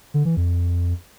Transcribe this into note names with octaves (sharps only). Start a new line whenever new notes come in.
D3
E3
F2